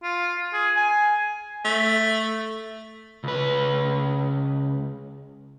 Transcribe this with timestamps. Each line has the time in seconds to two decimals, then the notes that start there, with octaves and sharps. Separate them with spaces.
0.03 F4
0.53 G#4
0.76 G#5
1.65 A3
3.24 C#2 B4